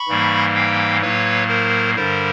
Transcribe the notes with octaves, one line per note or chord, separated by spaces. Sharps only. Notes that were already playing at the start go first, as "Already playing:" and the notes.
Already playing: B5 C#6
G#2 E3 G3 A#3
F5 G5
A2 F#3 A#3 B4 C#5
A#4 C5
G2 D3 G3 A#4 C5